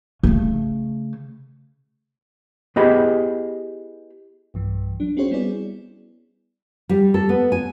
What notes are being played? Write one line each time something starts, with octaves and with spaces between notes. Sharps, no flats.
C#3 A3
B3 E4 G4 G#4 D#5 B5
B1 G2 E3
F#3 D4
C4 C#4 F#4 G#4 C5 C#5
G3 B3 E4 G#4 D5
G3
A4
B3
G#5